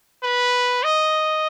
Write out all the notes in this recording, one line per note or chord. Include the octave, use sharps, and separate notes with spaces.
B4
D#5